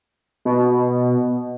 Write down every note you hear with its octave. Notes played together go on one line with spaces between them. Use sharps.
B2